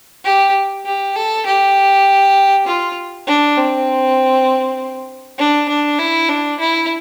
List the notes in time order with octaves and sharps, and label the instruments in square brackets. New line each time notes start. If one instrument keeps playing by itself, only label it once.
[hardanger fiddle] G4
G4
A4
G4
F4
D4
C4
D4
D4
E4
D4
E4